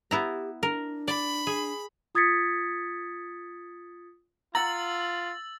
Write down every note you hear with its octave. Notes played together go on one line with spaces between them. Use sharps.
B3 E4 G4 A#5
D4 A#4
D5 B5
G#4
F4 D#6 G#6 A6 B6 C#7
F4 F#5 A#5 E6 A6 F#7